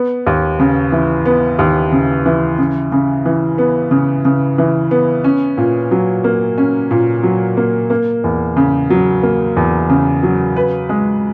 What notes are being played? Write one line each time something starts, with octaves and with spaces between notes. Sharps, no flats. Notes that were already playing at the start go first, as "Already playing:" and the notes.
Already playing: B3
D#2
C#3
E3
B3
D#2
C#3
E3
C#3
C#3
E3
B3
C#3
C#3
E3
B3
C#4
A#2
F#3
A#3
C#4
A#2
F#3
A#3
A#3
E2
C#3
F#3
A#3
E2
C#3
F#3
B4
G#3